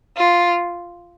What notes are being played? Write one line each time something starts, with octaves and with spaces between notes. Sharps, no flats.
F4